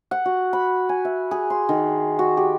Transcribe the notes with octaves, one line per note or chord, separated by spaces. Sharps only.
F#5
F#4
B5
G#5
E5
G#4
C6
D#3
F#4
G4